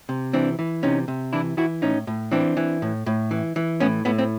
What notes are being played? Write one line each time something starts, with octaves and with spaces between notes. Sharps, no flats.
C3
E3 C4 D4
E3
C3 C#4 D#4
C3
E3 D4 E4
E3 E4 F#4
A2 C#4 D#4
A2
E3 C4 D4
E3
A2
A2
E3
E3
A2 B3 C#4
A2 B3
C4